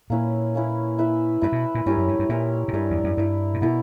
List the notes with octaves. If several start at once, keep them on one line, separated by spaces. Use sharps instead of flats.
A#2 A#3 C#4 E4 B4
A#3 C#4 E4 B4
E4 B4 E5
G2 E4 B4 E5
B2
A#2
G2 C#4 E4 G4 A#4
F#2
G2
G2
A#2 C#4 E4 G4 A#4
A#2
G2 E4 A#4 D5
E2
F#2
G2 E4 A#4 D5
A#2
B2 B3 E4 A#4